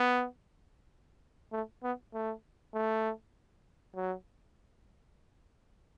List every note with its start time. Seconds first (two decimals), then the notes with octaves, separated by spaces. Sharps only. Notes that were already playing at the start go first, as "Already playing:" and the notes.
Already playing: B3
1.52 A3
1.83 B3
2.14 A3
2.74 A3
3.95 F#3